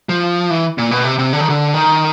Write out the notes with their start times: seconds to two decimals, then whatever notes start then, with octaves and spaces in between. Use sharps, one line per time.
0.09 F3
0.50 E3
0.78 A#2
0.91 B2
1.05 C3
1.19 C3
1.33 D3
1.40 D#3
1.49 D3
1.74 D#3